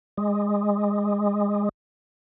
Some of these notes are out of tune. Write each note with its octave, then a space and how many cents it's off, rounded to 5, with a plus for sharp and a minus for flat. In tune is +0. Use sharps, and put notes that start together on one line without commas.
G#3 -20